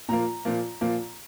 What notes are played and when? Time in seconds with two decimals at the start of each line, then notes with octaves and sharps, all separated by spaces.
0.09 A#2 F3 A#3 A#5
0.45 A#2 F3 A#3
0.81 A#2 F3 A#3